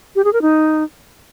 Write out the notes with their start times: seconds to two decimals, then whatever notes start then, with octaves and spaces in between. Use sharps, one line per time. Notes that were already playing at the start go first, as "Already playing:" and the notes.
0.16 G4
0.24 G#4
0.33 A#4
0.42 D#4